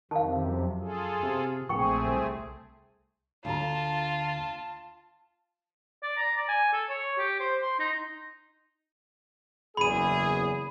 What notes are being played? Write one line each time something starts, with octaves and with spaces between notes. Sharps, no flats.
F2 C3 D#3 F5 A5
F#2
F4 G#4 A4
C3
A#1 A3 C4 G#4 G5 B5 C#6
C2
D2 F4 A5 A#5
D5
A#5
D5
G#5
A4
C#5
G4
C5
C6
D#4
F#1 E2 G#4 B5 D#7